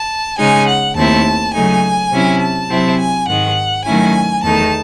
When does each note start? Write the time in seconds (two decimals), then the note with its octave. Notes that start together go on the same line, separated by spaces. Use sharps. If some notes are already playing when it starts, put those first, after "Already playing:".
Already playing: A5
0.38 C#3 G#3 D#4 G#5
0.68 F#5
0.96 D#2 D#3 A3 C4 E4 A5
1.54 C#3 F#3 A3 D#4 G#5
2.12 C3 F#3 C#4 E4
2.41 A5
2.70 C3 F#3 C4 E4
2.99 G#5
3.28 G#2 D#3 G#3 F#5
3.86 D#3 F#3 A3 C#4 E4 G#5
4.43 E2 D#3 A3 D#4 A5